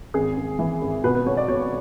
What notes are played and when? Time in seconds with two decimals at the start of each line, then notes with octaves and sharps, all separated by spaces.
0.14 G#1 G#4
0.37 G#1
0.59 E3
0.82 G#1
1.04 B2 B4
1.15 B4
1.26 B1 C#5
1.37 D5
1.48 B2 C#5